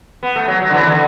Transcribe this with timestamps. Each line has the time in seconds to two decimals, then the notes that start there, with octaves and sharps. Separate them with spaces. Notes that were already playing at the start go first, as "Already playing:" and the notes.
0.23 B3
0.36 A3
0.48 F#3
0.62 F#3
0.70 D3
0.74 E3
0.81 B2
0.87 D3